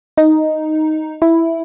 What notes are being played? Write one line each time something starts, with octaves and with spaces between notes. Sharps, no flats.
D#4
E4